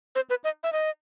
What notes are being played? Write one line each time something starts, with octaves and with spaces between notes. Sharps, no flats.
C5
B4
D#5
E5
D#5